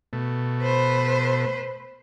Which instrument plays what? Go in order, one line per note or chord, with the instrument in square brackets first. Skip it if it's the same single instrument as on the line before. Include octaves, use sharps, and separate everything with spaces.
[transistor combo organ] B2 A3
[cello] B4 C5